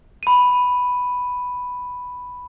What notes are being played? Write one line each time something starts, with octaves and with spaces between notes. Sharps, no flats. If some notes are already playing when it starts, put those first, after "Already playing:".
B5 D#7